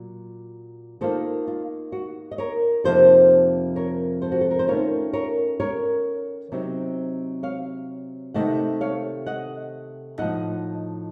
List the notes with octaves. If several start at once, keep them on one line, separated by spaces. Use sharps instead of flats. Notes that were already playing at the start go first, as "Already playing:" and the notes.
Already playing: A#2 F#3
D#3 A#3 F4 A4 C5
F4
F#4
D#5
A#4 C#5
F2 C3 F3 A#3 D#4 A4 C5
A#4 C#5
A4 C5
F#4
A4
A#4
C5
D#3 A3 C#4 F4 A#4 C#5
A#4 C#5
A#4 C#5
C3 F#3 C4 D#4
C#5 F5
C3 D#3 A3 D#5 F#5
C#5 F5
D#5 F#5
A2 F3 A3 D#4 D#5 F#5